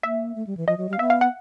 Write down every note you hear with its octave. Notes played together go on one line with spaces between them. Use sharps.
A#3 E5
A3
G3
E3
F3 D#5
F#3
G3 F5
B3 E5
F5
F#5